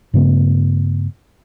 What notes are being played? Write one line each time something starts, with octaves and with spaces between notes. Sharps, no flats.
G2 C#3 A3 B3